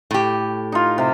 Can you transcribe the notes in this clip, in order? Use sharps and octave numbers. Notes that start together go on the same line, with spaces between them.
A2 G4
D#4 F4
C3